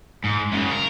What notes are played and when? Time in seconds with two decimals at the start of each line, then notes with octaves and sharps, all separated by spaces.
0.24 G#2
0.52 F#2 C#3
0.71 A#4